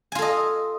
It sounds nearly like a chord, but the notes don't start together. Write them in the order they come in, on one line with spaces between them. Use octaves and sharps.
G#5 F4 A4 D#5